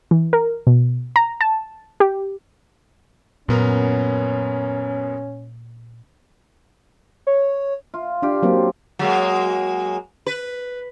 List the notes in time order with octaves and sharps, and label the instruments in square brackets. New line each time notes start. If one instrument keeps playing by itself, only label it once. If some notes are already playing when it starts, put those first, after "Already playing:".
[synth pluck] E3
A#4
B2
A#5
A5
G4
[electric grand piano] F#2 B3 A#4 [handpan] A#2 [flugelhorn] C#4
[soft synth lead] C#5
[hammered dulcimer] F4
[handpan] D4 [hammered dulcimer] F4 G4 F5
[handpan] F#3 A#3 C4
[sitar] F#3 G#3 A#3
B4